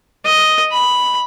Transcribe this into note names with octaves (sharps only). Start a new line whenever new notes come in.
D#5
B5